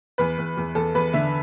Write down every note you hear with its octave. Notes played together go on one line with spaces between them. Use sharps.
E2 B4
E2
E2
E2 A4
E2 B4
D3 E5